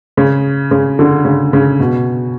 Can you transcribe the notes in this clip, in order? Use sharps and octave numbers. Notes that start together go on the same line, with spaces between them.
C#3
C#3
D3
C#3
C#3
B2